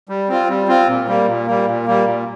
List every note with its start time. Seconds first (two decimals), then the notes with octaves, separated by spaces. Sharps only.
0.09 G3
0.29 C4 F4
0.48 G3
0.68 C4 F4
0.87 A#2
1.08 G3 A#3
1.27 A#2
1.46 G3 A#3
1.66 A#2
1.86 G3 A#3
2.05 A#2